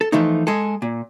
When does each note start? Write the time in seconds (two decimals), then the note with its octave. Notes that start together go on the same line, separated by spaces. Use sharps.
0.01 A4
0.12 E3 F3 A3 D#4
0.47 G#3 G#4 A4
0.82 A#2